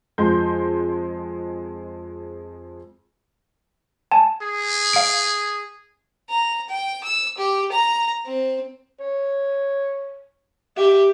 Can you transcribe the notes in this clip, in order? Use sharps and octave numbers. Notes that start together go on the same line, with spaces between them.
F2 G#3 C6 G6
G#5 A5
G#4
F5 D7
A#5
G5
E6
G4
A#5
C4
C#5
G4 E5